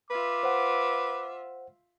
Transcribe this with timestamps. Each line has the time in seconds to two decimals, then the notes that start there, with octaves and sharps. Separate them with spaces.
0.11 F4 B4 E5 D6
0.43 C5 F#5